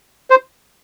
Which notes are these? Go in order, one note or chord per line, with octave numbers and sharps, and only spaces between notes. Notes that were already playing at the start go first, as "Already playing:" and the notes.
C5